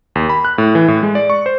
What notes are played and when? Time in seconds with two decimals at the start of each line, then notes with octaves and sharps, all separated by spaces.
0.15 D#2
0.29 B5
0.45 F#6
0.58 A2
0.75 E3
0.88 A2
1.03 G#3
1.15 D5
1.30 C#6
1.46 C5